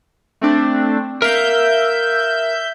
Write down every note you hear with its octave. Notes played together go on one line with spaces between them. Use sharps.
A3 C4 D4
A#4 E5 F5 G6